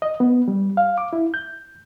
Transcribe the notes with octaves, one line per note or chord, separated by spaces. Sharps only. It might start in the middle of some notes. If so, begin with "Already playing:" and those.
D#5
B3
G3
F5
D6
E4
G6